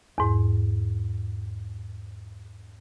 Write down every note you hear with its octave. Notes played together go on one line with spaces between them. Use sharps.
E2 G#2